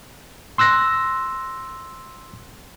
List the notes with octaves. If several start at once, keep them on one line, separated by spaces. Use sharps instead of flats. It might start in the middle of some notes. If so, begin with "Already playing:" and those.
C6 E6 F#6 A#6